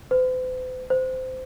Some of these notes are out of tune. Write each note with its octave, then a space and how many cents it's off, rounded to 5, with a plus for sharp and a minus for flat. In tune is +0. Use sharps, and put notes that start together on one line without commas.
C5 -45
C5 -20